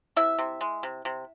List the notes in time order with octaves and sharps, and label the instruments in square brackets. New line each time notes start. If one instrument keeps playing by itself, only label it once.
[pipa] C3 E4 E5
C3
G#3
C3
C3